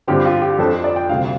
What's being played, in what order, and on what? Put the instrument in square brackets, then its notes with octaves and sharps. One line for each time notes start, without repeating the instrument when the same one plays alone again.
[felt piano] G2 D3 F3 C4 [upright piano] G4
[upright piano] F4
G4
[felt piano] F2 F3 D4 F4 C5 [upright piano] A4
[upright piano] D5
G5
[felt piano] D2 C3 G3 [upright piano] F5